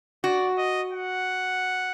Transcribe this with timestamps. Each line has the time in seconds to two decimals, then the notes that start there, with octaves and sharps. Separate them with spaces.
0.24 F#4 D5
0.58 D#5
0.92 F#5